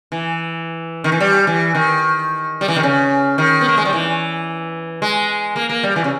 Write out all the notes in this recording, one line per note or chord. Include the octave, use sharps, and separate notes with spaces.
E3
D#3
E3
G3
E3
D#3
G3
E3
D#3
C#3
D#3
B3
A#3
G#3
G3
E3
G#3
A#3
A#3
G3
E3
C#3